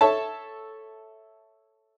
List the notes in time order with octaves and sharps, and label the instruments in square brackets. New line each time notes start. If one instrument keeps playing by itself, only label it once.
[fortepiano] A4 C#5 E5 A5